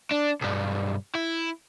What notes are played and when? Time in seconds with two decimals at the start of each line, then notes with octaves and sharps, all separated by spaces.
0.12 D4
0.41 B1 G2
1.15 E4